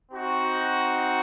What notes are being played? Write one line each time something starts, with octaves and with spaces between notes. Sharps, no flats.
C4 D#4 F#4